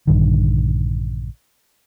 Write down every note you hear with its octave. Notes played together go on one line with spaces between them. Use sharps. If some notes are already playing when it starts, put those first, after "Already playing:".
A#1 G2 D3 D#3